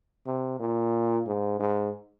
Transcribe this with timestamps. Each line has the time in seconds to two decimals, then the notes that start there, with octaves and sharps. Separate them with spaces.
0.27 C3
0.60 A#2
1.27 G#2
1.60 G#2